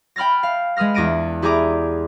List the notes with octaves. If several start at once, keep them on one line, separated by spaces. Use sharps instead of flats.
G5 B5 F6 A6 A#6
F5
G#3 B4 D#6 F6 A#6
E2 D4 A6 A#6 D7 D#7
E4 G4 G#4 D5 A#5 D6